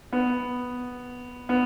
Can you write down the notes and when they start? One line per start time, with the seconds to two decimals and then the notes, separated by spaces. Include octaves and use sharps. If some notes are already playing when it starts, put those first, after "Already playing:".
0.13 B3
1.49 B3